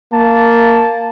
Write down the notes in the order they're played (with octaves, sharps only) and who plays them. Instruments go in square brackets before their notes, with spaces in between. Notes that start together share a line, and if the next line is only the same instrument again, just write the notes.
[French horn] A#3 [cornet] A5